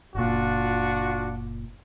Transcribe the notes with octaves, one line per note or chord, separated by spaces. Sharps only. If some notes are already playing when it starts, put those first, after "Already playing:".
F#1 A#2 D4 F4 F#4